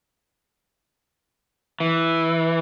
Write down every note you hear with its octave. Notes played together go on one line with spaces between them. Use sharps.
E3